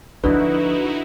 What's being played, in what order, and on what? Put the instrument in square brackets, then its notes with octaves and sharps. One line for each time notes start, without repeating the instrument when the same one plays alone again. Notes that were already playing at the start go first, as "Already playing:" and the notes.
[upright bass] D2 F3 [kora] D3 [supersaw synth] D#4 E4 F#4 [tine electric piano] B4